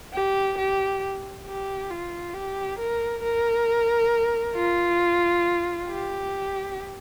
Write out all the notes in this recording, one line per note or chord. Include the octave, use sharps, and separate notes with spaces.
G4
G4
G4
F4
G4
A#4
A#4
F4
G4